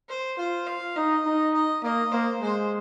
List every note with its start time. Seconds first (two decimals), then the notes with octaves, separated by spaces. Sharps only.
0.09 C5
0.38 F4 C5
0.67 F5
0.96 D#4 D#5
1.26 D#4
1.54 D#5
1.83 A#3 D#5
2.12 A#3 C5
2.41 G#3 C5